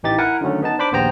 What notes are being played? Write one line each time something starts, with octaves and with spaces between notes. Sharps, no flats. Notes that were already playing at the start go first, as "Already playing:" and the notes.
A1 E3 D#4 G4 A6
E4 A#4 F#5 G#5
D3 D#3 F#3 A3 C#4
B3 D#4 A5
D4 C5 B5 D6
A#1 D#2 B3 C5 G5 A#5